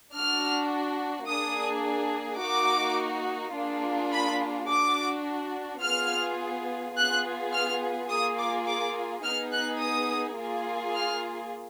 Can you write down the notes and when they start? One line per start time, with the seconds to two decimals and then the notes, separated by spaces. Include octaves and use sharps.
0.14 D4 F#4 F6
1.27 A#3 D4 G#4 D#6
2.41 A#3 D#4 F#4 D6
3.54 A#3 D4 F4 G#4
4.12 B5
4.69 D4 F#4 D6
5.82 B3 F4 G#4 F6
6.96 B3 F4 G#4 F#6
7.52 F6
8.09 A#3 F4 G#4 D#6
8.38 D6
8.67 D6
9.23 B3 D#4 G#4 F6
9.52 F#6
9.80 D#6
10.37 A#3 F4 G#4
10.95 F6